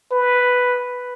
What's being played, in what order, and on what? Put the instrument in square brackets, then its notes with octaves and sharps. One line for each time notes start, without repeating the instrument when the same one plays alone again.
[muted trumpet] B4